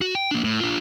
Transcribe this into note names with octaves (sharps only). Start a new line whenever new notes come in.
F#4
G5
A#3 D4
A2
D4 F4